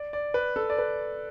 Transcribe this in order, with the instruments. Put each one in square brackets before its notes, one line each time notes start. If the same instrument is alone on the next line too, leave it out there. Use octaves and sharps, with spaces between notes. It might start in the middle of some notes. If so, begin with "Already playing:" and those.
Already playing: [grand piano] D5
D5
B4
A4
D5
B4